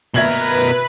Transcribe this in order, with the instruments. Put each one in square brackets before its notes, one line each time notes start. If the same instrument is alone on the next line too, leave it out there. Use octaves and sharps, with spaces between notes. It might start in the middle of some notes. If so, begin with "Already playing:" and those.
[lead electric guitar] B2 A#4 [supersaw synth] B4 [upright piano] E5 G#6 F#7